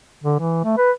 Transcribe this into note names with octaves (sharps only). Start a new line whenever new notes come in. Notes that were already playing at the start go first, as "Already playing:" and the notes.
D3
E3
A3
B4